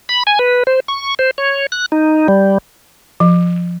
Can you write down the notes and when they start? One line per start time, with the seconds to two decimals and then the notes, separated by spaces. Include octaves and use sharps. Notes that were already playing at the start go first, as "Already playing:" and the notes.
0.09 B5
0.27 G#5
0.39 B4
0.67 C5
0.88 C#6
1.19 C5
1.38 C#5
1.72 F#6
1.92 D#4
2.28 G3
3.20 F3